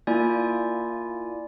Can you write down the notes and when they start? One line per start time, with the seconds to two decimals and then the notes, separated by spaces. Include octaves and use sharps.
0.07 A#3 E4 F4 D5 G#5